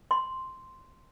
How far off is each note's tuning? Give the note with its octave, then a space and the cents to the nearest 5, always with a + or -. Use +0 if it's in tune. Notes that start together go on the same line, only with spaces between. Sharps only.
C6 -5